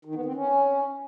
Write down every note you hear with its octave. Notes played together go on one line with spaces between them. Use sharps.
D#3
B3
C4
C#4